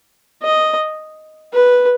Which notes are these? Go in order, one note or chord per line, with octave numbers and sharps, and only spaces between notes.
D#5
B4